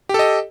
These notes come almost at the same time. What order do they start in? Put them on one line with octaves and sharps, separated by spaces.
G4 A4 D#5